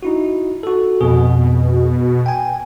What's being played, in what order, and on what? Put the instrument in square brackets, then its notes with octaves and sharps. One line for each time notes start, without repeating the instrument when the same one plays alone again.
[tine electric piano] D#4 E4 F#4
F#4 A4
[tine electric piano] F2 G#4 [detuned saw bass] B2
[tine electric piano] G5 G#5